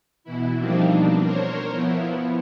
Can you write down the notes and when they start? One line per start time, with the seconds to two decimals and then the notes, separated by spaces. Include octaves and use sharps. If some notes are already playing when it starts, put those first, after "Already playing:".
0.24 B2 E3 E4
0.58 F3 G3 A#3 C4 D4 D#4
0.87 B2 D4
1.23 A#4 C5 C#5
1.71 F3 B3 E4